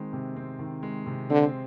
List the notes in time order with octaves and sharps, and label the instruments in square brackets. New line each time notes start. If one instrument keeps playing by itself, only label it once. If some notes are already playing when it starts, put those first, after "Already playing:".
Already playing: [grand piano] D#3 G#3 C4
C3
C4
D#3
G#3
C3
[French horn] D3 [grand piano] C4